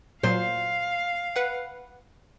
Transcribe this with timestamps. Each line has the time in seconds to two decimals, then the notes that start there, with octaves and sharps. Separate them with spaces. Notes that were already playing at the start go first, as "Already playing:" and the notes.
0.23 A#2 F#3 C5 F5
1.36 B4 F#5